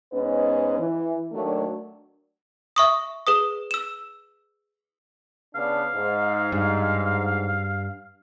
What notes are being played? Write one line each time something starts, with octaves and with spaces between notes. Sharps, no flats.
G#2 B3 C#4 B4 D#5
E3
D#2 F#3 A3 D4
E5 C#6 D#6
G#4 B4 D#6
E6 E7
C#3 B3 D4 F5
G#2
G2